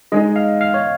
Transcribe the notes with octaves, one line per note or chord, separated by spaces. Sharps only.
G#3 D#4 G#4 D#5
F5
F5
C#5